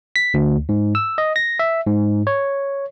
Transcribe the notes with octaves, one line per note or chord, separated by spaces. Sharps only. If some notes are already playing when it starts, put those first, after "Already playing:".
B6
D2
G#2
E6
D#5
A#6
E5
G#2
C#5